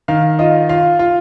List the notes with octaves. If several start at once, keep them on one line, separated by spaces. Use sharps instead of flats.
D#3 F5
F4 D#5
F4 F5
F4